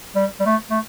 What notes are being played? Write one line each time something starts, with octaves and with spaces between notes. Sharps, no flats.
G3
G3
A3
A3